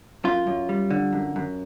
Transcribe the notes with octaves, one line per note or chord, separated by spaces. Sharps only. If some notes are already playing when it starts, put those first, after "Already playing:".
F#2 F4
F#2
G3
D3
F#2
F#2